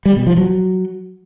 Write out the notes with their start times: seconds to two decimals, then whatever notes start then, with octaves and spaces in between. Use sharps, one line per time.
0.05 G3
0.16 B2
0.27 F3
0.37 F#3